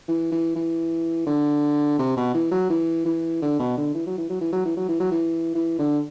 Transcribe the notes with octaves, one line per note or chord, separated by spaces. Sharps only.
E3
E3
E3
D3
C3
B2
E3
F#3
E3
E3
D3
B2
D3
E3
F#3
E3
F#3
E3
F#3
E3
F#3
E3
F#3
E3
E3
D3